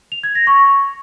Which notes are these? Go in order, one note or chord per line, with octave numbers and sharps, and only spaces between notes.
F7
G#6
A#6
C#6